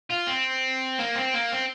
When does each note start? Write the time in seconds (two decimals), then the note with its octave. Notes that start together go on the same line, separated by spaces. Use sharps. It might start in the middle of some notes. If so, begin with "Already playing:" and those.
0.10 F4
0.27 C4
0.99 A#3
1.15 C4
1.34 A#3
1.52 C4